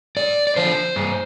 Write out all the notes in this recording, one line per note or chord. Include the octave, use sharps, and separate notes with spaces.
G2 D5
D5
D3 F3 C5
G2